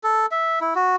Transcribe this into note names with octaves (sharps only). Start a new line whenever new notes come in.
A4
E5
E4
F#4